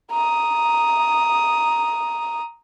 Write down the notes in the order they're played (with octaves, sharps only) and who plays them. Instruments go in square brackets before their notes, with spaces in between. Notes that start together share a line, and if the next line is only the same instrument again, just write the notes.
[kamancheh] A#5 D#6